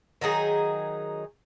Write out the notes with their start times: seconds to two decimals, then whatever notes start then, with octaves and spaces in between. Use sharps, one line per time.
0.21 D#3 F#3 D#4 G#4